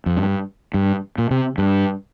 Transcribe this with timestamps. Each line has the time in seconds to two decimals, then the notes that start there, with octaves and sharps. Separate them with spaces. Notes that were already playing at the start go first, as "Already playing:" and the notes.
0.06 F2
0.17 G2
0.74 G2
1.18 A#2
1.31 C3
1.58 G2